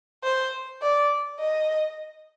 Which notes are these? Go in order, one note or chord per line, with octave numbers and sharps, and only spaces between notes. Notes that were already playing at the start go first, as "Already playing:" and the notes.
C5
D5
D#5